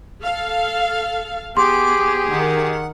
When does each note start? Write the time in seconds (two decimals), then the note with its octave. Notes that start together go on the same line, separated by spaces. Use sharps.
0.23 A4 F5
1.57 B3 G4 G#4 C6 D6
2.30 D#3 F#5